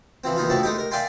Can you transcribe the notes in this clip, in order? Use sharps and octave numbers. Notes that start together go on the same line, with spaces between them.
E3 F3 C4
D#2 E3 D#4 F4
D2 D#3 F3 E4 A5 C#6
G#3 A3 D#4 G4
A#4
D5 E5 F5 G5 G#5 C6